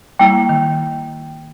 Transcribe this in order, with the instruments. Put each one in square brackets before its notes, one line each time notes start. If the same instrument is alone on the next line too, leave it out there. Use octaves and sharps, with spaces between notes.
[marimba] G3 A#3 E4 [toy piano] G5
[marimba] D#3